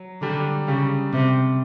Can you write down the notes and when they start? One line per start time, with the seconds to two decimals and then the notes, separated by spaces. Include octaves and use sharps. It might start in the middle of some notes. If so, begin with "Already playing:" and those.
Already playing: F#3
0.22 D3 G3
0.67 C#3 G3
1.13 C3